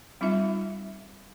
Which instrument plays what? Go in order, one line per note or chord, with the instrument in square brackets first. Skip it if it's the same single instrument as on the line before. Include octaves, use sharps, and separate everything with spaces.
[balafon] G3 C4 D#4 F4 E5